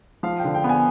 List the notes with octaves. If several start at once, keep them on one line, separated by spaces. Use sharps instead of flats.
F3 F5
G5
D3
G5
B3
G#5